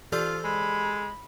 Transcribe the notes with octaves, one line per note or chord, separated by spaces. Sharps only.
E3 F4 G4 A4 C5 D5
G#3 B5